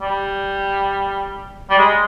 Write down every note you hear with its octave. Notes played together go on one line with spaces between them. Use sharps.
G3
G3
G#3